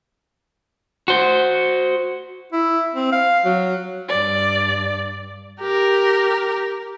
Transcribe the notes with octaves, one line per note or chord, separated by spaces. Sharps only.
F#4 C5
E4
C4
F5
F#3
G2 D5
G4 A#4